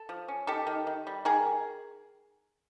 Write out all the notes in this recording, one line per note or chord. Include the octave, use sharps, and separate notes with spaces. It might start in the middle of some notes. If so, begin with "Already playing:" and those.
Already playing: A4
F3
C#4
D#3 G4 A4
D#3
D#3
G3
D#3 G#4 A#4